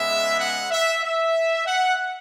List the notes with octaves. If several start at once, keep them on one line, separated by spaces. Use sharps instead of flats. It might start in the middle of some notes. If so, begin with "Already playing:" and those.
Already playing: C#3 G#3 B3 E5
F#5
E5
E5
F#5